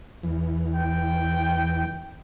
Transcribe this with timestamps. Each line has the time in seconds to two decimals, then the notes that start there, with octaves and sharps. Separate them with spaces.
0.23 E2
0.75 G5